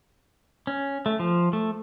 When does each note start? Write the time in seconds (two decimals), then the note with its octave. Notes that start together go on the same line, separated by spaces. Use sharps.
0.67 C#4
1.06 A3
1.19 F3
1.53 A3